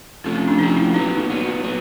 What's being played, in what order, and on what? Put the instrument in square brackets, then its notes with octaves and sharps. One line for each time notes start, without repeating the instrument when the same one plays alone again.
[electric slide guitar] F2 C3 F3 A3 [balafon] C#4
[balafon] C#4
D4
[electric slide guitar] F2 C3 F3 A3 [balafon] D#4
[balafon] E4
[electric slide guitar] A#2 F#3 B3 [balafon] D#4
[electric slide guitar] A#2 F#3 B3
F#3 B3